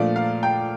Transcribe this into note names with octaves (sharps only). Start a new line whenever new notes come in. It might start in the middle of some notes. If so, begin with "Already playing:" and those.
Already playing: A#2 F3 A3 D4 D5
F5
G5